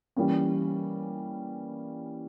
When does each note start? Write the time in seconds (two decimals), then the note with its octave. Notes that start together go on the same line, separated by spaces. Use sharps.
0.17 E3 G3 A#3 C#4